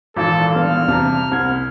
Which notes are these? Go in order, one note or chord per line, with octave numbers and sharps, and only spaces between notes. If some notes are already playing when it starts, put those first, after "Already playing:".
G#1 A#2 E3 A4
G3 B3 D4 F6
E2 C3 A5 A#5
C2 C4 G#6